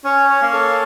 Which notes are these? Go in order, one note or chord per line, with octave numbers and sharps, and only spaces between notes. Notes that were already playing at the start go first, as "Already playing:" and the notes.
C#4 C#5
C#5
A#3
A4